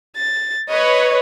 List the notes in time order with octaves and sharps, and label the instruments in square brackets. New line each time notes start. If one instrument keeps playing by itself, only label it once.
[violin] A6
[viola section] B4 C#5 [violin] D#5